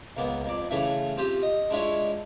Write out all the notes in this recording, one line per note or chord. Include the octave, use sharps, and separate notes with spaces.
C#2 A#3 B3
F2 D5
C#3 E3 A3
C4 F4 G4
D#5
G#3 D4 E4 F4 C#5